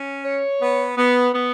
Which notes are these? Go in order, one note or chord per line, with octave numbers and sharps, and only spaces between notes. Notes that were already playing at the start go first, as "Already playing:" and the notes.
Already playing: C#4
C#5
B3
B3
B3